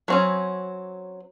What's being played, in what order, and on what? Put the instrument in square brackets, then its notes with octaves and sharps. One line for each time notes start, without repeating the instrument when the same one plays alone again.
[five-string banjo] F#3 C4 C#4